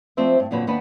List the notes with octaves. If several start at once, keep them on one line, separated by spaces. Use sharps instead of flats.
F3 A3 C4 C5 D5 E5
G2
F2 A#2 D3 F#3 B4
D#2 B3 D4 B4